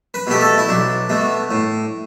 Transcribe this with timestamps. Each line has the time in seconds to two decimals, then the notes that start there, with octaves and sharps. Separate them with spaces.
0.14 B4
0.27 B2 A3 G4
0.41 A4
0.58 E4
0.69 B1 D4
1.09 B2 A3
1.51 A2